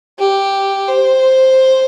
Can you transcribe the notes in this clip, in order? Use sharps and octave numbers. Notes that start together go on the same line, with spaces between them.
G4
C5